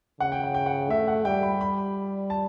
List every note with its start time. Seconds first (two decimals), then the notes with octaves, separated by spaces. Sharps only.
0.20 C#3 F#5
0.32 G5
0.43 F#5
0.54 G5
0.66 F#5
0.90 A3 E5
1.08 F#5
1.25 G3 G5
1.43 B5
1.61 B5
2.30 A5